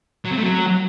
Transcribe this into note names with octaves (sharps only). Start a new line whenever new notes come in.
F#3
C4
A3
F#3